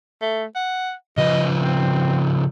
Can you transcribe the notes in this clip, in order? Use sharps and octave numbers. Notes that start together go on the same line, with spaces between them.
A3
F#5
C#3 F3 B4 D#5
C4